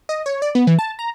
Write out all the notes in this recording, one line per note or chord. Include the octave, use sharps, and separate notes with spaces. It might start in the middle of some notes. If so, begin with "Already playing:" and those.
D#5
C#5
D5
B3
E3
A5
A#5